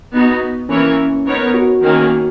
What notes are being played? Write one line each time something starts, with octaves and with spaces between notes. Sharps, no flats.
B3 D#4 F#4
E3 A#3 C#4 E4 A#4 C#5
B3 D#4 A#4 C#5
F#4
D#3 A#3 C#4